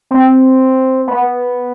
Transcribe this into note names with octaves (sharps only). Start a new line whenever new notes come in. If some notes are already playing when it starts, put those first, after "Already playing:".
C4
B3